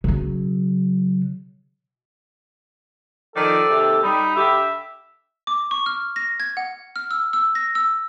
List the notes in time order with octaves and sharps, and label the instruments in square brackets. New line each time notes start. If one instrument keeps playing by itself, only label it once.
[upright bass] C#3 F#3
[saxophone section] D#3 F3 [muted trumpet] A4 [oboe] D5
[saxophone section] D#2 C3 G4
[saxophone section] G3 [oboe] D#4 [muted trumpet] B5
[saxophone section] D3 G4 [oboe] E5
[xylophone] D6
C#6
F6
A#6
G#6
F#5
F6
E6
E6
A#6
E6